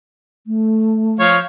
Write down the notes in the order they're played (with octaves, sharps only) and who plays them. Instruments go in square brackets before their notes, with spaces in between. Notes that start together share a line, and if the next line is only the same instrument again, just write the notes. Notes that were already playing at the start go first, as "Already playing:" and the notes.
[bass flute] A3
[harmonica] F3 C#5 F5